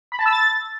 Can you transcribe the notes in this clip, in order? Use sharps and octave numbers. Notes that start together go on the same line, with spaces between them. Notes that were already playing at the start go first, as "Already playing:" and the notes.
B5
A5
E6
A6